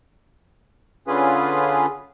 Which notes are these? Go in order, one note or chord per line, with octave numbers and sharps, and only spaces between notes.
D3 C#4 F4 G#4 B4